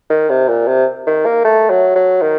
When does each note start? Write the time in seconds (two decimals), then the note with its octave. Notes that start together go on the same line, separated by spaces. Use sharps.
0.10 D#3
0.29 C3
0.48 A#2
0.68 C3
1.07 D#3
1.25 A#3
1.44 A3
1.70 F#3
1.96 F#3
2.22 D#3